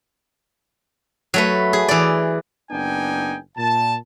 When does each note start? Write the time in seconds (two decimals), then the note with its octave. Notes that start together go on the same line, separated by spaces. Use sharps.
1.34 F#3 A3 B4
1.73 G#4
1.88 E3 D5
2.71 F#1 B3 D4 D#4 G5 G#5
3.57 A#2 A5